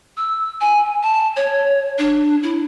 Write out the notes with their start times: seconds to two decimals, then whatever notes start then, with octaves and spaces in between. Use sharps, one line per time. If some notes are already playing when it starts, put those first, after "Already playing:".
0.17 E6
0.61 G#5
1.03 A5
1.36 C#5
1.98 D4
2.43 E4